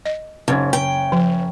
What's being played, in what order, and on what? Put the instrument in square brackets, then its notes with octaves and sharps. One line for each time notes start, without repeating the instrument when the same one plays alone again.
[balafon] D#5
[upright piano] F#1 C#4 G#6 [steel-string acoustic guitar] G#2
[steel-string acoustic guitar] G5
[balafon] F3